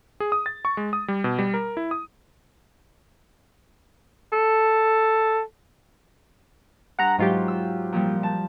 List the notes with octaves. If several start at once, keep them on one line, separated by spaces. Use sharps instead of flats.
G#4
D#6
A6
C#6
G#3
D#6
G3
B2
G3
A#4
E4
D#6
A4
G2 F#5 A#5
G#2 F#3 F4 G4
E6
A#2 F3 G3
A5